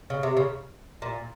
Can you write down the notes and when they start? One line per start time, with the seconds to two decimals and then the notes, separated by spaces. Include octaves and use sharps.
0.10 C#3
0.23 C3
0.37 C#3
1.02 A#2